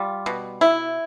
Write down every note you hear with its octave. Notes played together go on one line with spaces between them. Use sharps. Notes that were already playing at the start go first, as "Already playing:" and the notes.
Already playing: G3 F4
B2
E4